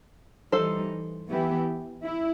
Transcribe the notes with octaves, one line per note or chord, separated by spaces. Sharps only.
E3 G3 D#4 A4 C5
E3 B3 E4 G4
E4